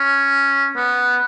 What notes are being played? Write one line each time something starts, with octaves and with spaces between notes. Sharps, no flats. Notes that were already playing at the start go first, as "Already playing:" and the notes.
Already playing: C#4
B3